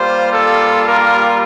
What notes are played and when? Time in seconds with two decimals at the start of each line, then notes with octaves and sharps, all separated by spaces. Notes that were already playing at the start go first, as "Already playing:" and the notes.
Already playing: G3 A#3 F4 C5
0.32 A4
0.86 A#4